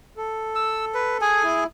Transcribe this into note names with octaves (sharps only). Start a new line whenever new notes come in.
A4
E6
B4
G#4 G#5
E4